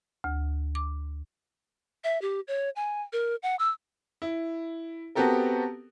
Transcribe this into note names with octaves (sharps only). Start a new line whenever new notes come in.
D2
D6
E5
G4
C#5
G#5
A#4
F#5
E6
E4
B3 C4 F#4 G4 A4 A#4